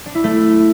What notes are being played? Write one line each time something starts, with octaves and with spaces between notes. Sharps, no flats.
D4
E4
A3